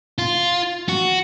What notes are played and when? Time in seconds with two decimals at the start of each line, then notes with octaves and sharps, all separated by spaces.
0.18 F4
0.88 F#4